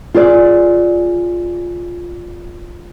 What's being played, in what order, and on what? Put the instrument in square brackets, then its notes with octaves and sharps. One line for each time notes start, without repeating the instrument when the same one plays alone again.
[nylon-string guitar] F4 G#4 D5